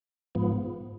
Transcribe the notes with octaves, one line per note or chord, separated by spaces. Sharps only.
G#2 F3 B3